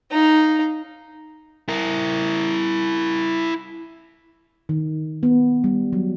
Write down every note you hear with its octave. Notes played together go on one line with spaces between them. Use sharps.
D#4 F5
E4 A#4
D#3
B3
G3
F#3